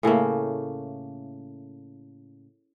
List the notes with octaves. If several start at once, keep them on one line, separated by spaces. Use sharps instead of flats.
A2 C#3 A3 A#3